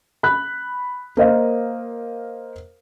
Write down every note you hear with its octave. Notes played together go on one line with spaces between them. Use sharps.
B5 F#6
A#3 A#4 C5 D#5 F5